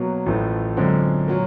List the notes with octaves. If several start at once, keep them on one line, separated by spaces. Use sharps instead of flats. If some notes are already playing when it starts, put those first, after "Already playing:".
Already playing: B2 F#3 A#3
A1 A2 F3 A3
F#2 D3 F3 G#3 C4
A#2 F#3 A#3